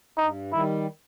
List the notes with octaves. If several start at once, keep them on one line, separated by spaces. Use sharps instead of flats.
G2 D#4
D#3 G3 E4